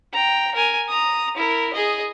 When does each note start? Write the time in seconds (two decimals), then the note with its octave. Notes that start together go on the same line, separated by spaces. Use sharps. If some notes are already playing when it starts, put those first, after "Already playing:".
0.13 G5 A#5
0.55 A#4 G#5
0.89 A#5 D#6
1.37 E4 A#4
1.73 G#4 D#5